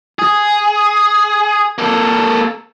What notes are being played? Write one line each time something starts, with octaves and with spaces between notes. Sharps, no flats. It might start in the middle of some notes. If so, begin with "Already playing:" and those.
G#4
A#3 A4